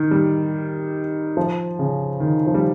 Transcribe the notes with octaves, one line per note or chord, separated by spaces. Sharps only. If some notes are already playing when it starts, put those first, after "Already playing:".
Already playing: D#3
G3
F3
C#3
D#3
F3
G3